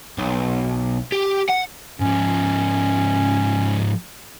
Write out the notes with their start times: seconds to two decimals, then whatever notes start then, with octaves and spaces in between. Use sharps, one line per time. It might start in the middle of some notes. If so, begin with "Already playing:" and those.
0.19 B1
1.12 G4
1.50 F#5
2.00 G#2 F3 C#4